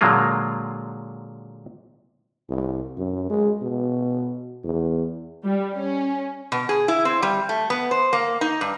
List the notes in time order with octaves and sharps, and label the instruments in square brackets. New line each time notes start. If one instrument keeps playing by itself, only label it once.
[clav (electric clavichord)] A#2 D3 F#3 G#3 A#3 F4
[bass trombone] C2
F#2
G#3
B2
E2
[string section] G3
C#4
[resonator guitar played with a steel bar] B2
G#4
E4
C4
G3
A3
B3
C5
A#3
D#4
G2